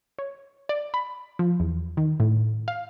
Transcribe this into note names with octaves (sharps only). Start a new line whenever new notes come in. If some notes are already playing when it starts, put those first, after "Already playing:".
C#5
D5
B5
F3
E2
D#3
A2
F5